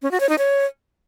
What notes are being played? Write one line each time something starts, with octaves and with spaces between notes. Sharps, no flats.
C#4
F#4
C#5
D#4
C#5